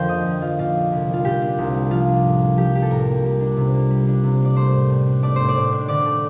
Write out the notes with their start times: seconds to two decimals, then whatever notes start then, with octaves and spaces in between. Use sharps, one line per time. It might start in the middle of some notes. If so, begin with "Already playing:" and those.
Already playing: F2 D3 F3 A#4 C5 G5
0.09 A#3 D#5
0.26 F2
0.42 F3 F4
0.59 A#2 F4
0.76 D4
0.92 C2
1.09 G3 F4
1.25 A#2 G4
1.42 D4
1.58 C2
1.74 G3
1.91 F3 F4
2.08 D4
2.24 A2
2.41 A#3
2.57 F3 G4
2.75 D4 G4
2.82 A4
2.90 A2 A#4
3.07 A#3
3.24 G3
3.41 D4
3.57 C3
3.74 A#3
3.90 G3
4.07 D4
4.24 C3
4.39 A#3
4.45 D5
4.55 A3 C5
4.73 A2
4.89 A2
5.06 D4
5.23 A3 D5
5.36 A2 C5
5.49 D5
5.55 A2
5.73 D4
5.88 D3 D5
6.06 A3